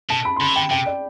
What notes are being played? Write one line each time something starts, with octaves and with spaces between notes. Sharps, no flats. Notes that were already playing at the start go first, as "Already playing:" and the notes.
B2 A5
B5
C6
D3 B5
E3
D3 G5
C3 G5
D5